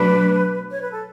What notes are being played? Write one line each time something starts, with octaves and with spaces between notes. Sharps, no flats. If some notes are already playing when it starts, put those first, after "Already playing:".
Already playing: B2 F#3 A3 D4 B4
C#5
B4
A4